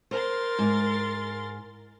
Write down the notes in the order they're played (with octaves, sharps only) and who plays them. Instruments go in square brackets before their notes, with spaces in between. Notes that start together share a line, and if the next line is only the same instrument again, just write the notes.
[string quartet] A#4 C6 A6 [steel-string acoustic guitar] C5
[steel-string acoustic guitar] G#2